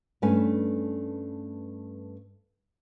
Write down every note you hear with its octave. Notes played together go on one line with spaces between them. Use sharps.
G2 A3 C#4 B4 G#5